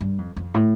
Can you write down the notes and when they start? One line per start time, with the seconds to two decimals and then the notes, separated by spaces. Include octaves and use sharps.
0.01 G2
0.18 F2
0.36 F2
0.54 A2